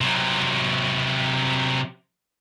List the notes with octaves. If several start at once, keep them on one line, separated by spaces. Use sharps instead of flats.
C3 F#3